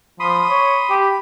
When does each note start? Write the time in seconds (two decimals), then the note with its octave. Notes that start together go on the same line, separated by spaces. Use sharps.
0.20 F3 B5 C6 D#6
0.50 C#5
0.90 G4
1.01 B5